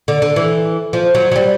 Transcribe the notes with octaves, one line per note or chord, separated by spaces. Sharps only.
D3
D3
E3
F3
F#3
F#3
G3